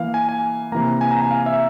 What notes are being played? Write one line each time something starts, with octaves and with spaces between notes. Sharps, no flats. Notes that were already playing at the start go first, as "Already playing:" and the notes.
Already playing: E3 A#3 F5
G#5
G#5
C3 E3 A#3 A#5
G#5
A#5
G#5
F5
E5